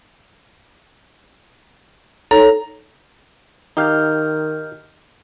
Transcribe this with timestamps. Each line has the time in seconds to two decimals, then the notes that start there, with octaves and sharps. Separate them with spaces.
2.31 D#4 A4 C#5 A#5
3.77 D#3 D#4 G4 D#5 F5 F6 G6